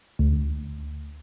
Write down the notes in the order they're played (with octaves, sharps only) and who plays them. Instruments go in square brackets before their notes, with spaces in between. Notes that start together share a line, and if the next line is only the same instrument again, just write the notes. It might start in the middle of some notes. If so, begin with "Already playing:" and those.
[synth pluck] D2